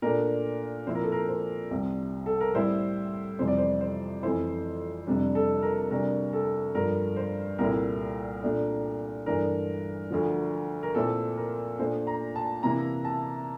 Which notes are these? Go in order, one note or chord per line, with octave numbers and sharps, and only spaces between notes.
A#2 A3 D4 A#4
A#2 F3 C4 E4 C5
A#4
A4
A#4
C5
C2 C3 G3
A4
A#4
A2 G3 C4 E4 C5
F2 C3 E3 G3 C5
D5
C5
C5
F2 E3 A3 E4 C5
F2 C3 G3 D4
A4
A#4
D2 C3 G3 D4 A#4
A4
G2 F3 A3 D4 A#4
C5
C2 A#2 A3 E4 A#4
A#2 A3 D4
G2 E3 A3 D4 A#4
D2 D3 F3
A#4
A#2 A3 C4 E4 A4
A#4
A#2 A3 D4 C5
A#5
A5
C3 E3 A#3 E4 A#5
A5